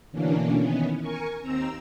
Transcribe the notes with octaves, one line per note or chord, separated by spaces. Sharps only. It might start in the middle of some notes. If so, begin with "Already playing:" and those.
B2 D3 E3 A#3 C#4 D4
D#3 E3 B3 C#4
A#4 G#5 C#6
D#2 C4 A#5 E6